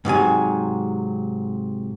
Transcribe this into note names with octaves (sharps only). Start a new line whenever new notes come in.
G#2 C3 F#3 G#5